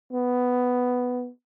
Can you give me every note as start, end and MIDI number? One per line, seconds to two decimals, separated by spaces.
0.13 1.29 59